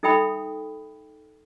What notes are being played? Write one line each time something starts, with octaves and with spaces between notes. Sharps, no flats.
D#4 A4 E5 G5 B5 D#6